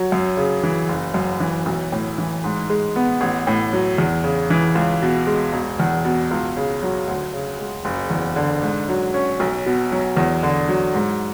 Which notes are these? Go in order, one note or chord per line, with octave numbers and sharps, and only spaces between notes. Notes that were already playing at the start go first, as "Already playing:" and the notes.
Already playing: F#3
F#2
C#3
E3
F#1
F#2
E3
B1
A2
E3
G#2
G#3
B3
A1
A2
F#3
E2
C#3
E3
C#2
B2
G#3
E1
E2
B2
C#2
C#3
F#3
D2
C#3
G#3
F#1
E2
D3
G#2
F#3
C#4
B1
B2
F#3
E2
D3
F#3
G#2